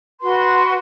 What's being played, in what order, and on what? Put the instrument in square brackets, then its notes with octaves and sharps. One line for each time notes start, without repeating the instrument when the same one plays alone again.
[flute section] F#4 B4 C6